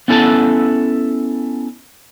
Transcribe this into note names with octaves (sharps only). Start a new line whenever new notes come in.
B3 C#4 E4 A4 F#5 A5